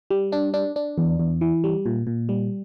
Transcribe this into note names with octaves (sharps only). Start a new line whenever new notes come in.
G3
D4
D4
D4
E2
E2
E3
G3
A#2
A#2
G3